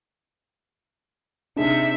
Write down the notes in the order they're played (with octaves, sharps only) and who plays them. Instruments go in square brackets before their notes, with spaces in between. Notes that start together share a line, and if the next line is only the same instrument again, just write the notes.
[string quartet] C3 E5 [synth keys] D4 D#4 G#4